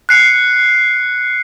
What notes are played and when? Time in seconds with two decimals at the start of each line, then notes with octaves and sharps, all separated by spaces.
0.09 F#6 C7 C#7